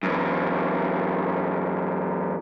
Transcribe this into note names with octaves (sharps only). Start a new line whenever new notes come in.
F#2 E3